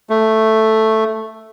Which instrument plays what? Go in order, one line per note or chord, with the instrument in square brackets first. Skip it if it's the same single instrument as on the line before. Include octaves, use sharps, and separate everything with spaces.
[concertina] A3